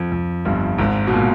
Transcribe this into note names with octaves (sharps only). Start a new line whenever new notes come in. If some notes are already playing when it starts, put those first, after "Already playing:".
Already playing: F2
F2
G1 G2
G#1 G#2
B2
A#2